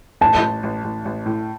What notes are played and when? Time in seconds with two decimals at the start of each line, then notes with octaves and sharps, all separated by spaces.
0.21 A1 A5
0.42 A1
0.63 A1
0.84 A1
1.05 A1
1.26 A2